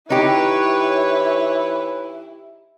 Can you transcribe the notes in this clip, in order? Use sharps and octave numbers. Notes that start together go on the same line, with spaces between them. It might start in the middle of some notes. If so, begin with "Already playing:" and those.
E3 D#4 E4 G4 B4 C#5